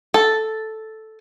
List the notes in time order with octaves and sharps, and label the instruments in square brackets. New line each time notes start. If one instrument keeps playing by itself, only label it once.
[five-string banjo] A4